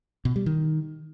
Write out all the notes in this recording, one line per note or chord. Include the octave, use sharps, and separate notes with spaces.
B2
G3
D#3